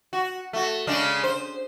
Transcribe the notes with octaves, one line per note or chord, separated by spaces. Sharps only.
F#4
A3 F#4
C#3 G#3 D4
C5